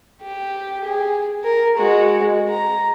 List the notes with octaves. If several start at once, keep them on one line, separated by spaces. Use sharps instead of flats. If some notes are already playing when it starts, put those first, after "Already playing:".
G4
G#4
A#4
G#3 F#4
A#5